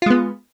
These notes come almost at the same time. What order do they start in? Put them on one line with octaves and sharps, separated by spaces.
F4 G#3 B3